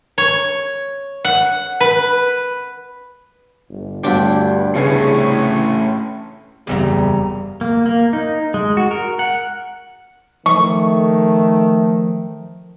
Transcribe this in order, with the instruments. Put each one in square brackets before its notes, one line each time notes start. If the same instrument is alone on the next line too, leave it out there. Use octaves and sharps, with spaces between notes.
[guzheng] C#5
F#5
B4
[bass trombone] G1
[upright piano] G1 D2 [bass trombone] G2 [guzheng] D4 G4
[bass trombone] C2 [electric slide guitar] A2 C#4 [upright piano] C#3 B4 C7
[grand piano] F#1 E2 [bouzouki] C#3 A4 A#5 [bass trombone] G3
[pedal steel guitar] A#3
A#3
D#4
G#3
F#4
A#4
F#5
[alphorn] D#3 [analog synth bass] F3 [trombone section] A3 [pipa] C#6